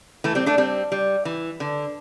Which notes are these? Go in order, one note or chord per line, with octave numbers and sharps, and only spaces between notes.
E3 A3
G3 C4
A3 D4
G3 C4
G3
E3
D3